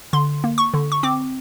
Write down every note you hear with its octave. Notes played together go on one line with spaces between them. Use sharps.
D3 C6
A#3
C#6
D3
C#6
C4 D6